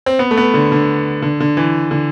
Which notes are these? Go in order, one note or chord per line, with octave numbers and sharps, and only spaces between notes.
C4
B3
A3
B3
D3
D3
D3
D3
E3
D3